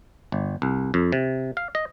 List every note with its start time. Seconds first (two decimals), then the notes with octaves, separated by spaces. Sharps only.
0.32 G1
0.62 C2
0.94 F2
1.12 C3
1.57 F5
1.75 D#5